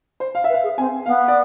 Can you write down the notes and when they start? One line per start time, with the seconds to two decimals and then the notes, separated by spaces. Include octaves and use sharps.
0.20 C5
0.35 F5
0.44 B4 E5
0.54 F5
0.63 G#4
0.77 C4 G#5
1.06 B3 F5
1.28 D5